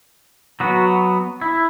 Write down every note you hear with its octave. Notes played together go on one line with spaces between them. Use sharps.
F#3 B3 F#4
E4